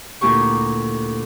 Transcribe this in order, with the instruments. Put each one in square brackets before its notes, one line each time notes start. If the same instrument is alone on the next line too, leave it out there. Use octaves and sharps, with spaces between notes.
[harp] D2 A#2 A#3 E4 G4 C#6